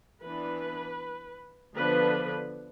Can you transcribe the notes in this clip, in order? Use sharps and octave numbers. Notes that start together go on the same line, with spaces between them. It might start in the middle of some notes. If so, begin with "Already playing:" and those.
E3 B3 D4 B4
D3 F3 B3 D4 B4